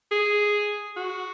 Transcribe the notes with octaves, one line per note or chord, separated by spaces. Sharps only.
G#4
F#4